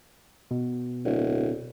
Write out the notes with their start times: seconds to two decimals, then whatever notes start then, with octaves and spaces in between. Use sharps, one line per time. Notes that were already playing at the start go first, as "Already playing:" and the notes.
0.51 B2
1.04 D1